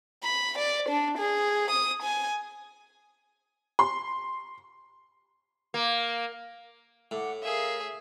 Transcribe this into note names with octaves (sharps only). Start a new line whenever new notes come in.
B5
D5
D4
G#4
D#6
G#5
C6
A#3
A2 F#5 D6
G#4 A#4 E5 F5